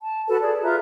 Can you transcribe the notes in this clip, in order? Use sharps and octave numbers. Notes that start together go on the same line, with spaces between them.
A5
F#4 A4 B4 A5
G#4 D5
F4 B4 E5 A#5